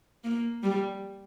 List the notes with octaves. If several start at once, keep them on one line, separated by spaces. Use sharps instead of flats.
A#3
G3